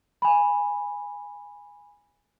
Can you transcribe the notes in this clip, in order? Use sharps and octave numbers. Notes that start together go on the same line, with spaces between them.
G#5 B5